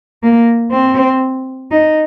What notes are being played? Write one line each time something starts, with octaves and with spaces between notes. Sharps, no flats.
A#3
C4
D#4